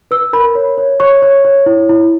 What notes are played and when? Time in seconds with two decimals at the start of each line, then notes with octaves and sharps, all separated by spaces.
0.11 B4 E6
0.33 A#4 B5
0.55 C#5
0.78 C#5
1.00 C#5 C#6
1.22 C#5
1.45 C#5
1.66 E4
1.89 E4